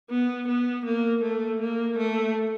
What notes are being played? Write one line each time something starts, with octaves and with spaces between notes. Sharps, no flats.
B3
B3
A#3
A3
A#3
A3